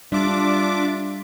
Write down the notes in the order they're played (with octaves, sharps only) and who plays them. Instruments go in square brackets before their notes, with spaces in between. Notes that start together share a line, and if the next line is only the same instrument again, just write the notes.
[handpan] G3 [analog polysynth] D4 D6 [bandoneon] F4 E5